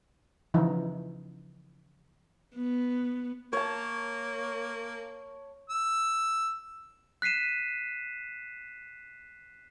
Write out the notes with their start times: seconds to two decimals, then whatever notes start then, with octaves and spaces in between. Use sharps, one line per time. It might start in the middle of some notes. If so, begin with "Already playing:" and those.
0.54 C#3 E3 F3 D#4
2.56 B3
3.53 A#3 C#5 A5
5.70 E6
7.22 F#6 B6 C7 D#7 E7